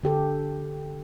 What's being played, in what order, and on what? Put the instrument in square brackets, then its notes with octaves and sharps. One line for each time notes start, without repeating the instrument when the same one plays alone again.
[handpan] D3 G4 A4